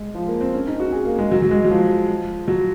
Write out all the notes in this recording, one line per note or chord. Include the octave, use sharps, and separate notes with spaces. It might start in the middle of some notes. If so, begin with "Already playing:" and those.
Already playing: G#3
F3
A#3
C4
C#4
D#4
F#4
G#4
A#3
G#3
F#3
F#3
G#3
F#3
F3
F#3